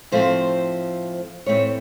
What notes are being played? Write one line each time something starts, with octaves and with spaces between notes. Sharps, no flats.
A2 F3 A3 C4 C5
A2 E3 A3 C4 C#5